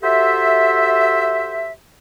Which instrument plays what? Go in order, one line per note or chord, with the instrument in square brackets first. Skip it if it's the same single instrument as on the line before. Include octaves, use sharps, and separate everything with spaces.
[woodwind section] F#4 G4 A4 C5 E5